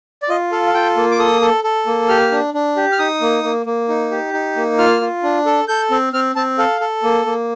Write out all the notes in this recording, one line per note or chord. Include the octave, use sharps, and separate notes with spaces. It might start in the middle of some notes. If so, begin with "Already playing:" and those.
D5
F4 D#5
A4 F5
F5
F4 G5
A#3
D6
A4 D#6
A4
A4
A#3
G4 F6
D4
D4
G4
F6
D#4 D#6
A#3
A#3
A#3
D#4
G4
D#4
A#3
F4 F6
F4
D4
A4
A4 G6
C4
C4 F6
C4 A5
A4 F5
A4
A#3
A#3